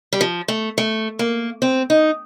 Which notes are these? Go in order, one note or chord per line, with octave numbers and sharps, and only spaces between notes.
G3
F3
A3
A3
A#3
C4
D#4